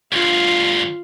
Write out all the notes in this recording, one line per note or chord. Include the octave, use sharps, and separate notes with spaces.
D2 G2 F4